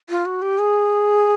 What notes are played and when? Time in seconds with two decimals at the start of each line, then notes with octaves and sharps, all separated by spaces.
0.09 F4
0.26 F#4
0.42 G4
0.59 G#4